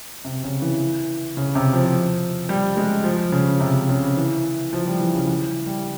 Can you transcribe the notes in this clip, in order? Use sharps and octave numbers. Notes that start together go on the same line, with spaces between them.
C3
C#3
E3
C#3
C3
F3
G3
G#3
F3
C#3
C3
C#3
E3
F3
G3
E3
C#3
E3
G3